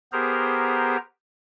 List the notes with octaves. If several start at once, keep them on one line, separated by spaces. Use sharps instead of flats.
B3 G4 G#4 A#4 C5 A#5